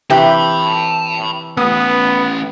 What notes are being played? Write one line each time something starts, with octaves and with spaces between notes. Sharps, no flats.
C3 E3 G4 G5 A5 B5
A3 B3 C#4 D#6